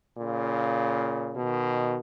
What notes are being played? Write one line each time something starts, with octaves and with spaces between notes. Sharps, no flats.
A#2 C#3
B2 D#3